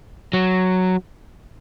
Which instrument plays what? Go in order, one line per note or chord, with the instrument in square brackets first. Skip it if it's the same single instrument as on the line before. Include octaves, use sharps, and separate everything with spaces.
[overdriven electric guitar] F#3